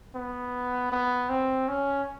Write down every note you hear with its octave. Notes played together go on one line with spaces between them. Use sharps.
B3
B3
C4
C#4